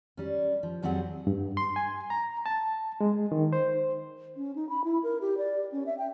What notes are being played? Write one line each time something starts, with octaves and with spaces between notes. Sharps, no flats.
G3 C#4
F3
F2 F#3 G3 C4 G#4 F#5
G2
C6
G#5
A#5
A5
G#3
D#3
C5
C#4
D#4
B5
E4
A#4
G4
D5
C#4
E5
G5